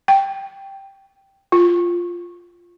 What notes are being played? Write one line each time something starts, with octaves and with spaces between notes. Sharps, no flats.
G5
F4